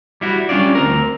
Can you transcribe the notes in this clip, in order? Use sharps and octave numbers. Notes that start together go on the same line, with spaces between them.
G3 E4 F#4
G3 C#4 D4 F4 D5
D2 C4 A#4